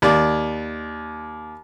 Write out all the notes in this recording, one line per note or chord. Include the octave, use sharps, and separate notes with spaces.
D#2 D5